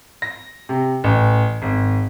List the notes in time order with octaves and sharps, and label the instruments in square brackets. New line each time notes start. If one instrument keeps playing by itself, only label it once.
[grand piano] A#6
C3
A1
G#1